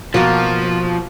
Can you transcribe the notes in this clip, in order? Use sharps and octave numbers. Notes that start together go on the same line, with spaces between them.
B2 F3 A#3 F#4 A#4